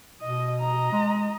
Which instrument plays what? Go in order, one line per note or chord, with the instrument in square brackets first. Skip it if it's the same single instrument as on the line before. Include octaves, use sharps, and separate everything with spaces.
[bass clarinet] B2 [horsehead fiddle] D#5
[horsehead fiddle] D#5 A#5
[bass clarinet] G#3